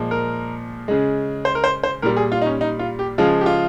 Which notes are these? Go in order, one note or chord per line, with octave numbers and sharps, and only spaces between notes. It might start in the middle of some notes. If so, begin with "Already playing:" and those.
Already playing: A#2 F3 G#3
A#4
C#3 G#3
C5
A#4
C5
C5
A#2 G3 A#4
G#4
F4
D#4
C#4
D#4
F4
G4
C#3 F3 G#3 F4
G4
F4